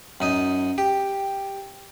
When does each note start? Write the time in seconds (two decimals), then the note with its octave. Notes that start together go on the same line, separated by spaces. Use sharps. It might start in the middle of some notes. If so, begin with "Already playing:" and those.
0.20 F#2 D#4 D#5
0.78 G4